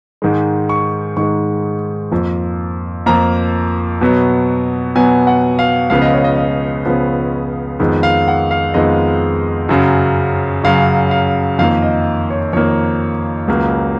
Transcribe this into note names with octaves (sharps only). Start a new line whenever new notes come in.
G#2 D#3 G#3
C#6
G#2 D#3 G#3 C#6
F2 F3 A#3
F2 F3 A#3 A#5
B2 F#3 B3
B2 F#3 B3 G#5
F#5
F5
C#2 C#3 F3 B3 F5
D#5
C#5
D#5
D#5
C#2 C#3 F3 B3
F2 D#3 G#3 B3
F5
F#5
F5
F2 D#3 G#3 B3 D#5
F#2 C#3 F#3
F#2 C#3 F#3 F5
F5
F2 D#3 A#3 F5
D#5
C#5
F2 D#3 A#3 C#5
C#2 C#3 F#3 A#3